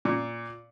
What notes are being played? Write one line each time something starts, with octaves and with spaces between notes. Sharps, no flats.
A#2